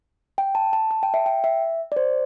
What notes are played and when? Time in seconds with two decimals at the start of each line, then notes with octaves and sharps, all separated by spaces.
0.38 G5
0.55 A5
0.73 A5
0.91 A5
1.03 G5
1.14 E5
1.26 G5
1.44 E5
1.92 D5
1.96 C5